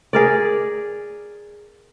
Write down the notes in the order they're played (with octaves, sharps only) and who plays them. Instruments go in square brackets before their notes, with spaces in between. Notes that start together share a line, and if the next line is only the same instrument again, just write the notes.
[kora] G#4 A#4 D5